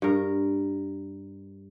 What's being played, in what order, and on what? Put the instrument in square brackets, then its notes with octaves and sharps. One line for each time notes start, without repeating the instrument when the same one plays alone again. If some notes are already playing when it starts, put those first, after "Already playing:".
[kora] G2 A#4